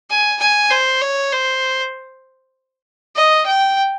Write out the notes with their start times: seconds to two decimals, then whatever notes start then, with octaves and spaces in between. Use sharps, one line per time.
0.10 G#5
0.40 G#5
0.70 C5
1.02 C#5
1.32 C5
3.16 D#5
3.47 G5